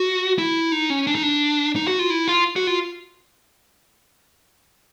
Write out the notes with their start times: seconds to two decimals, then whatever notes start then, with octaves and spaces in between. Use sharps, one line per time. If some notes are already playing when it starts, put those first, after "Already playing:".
Already playing: F#4
0.38 E4
0.72 D#4
0.90 C#4
1.07 D4
1.15 D#4
1.23 D4
1.76 D#4
1.87 F#4
1.99 F4
2.10 E4
2.28 F4
2.56 F#4
2.67 F4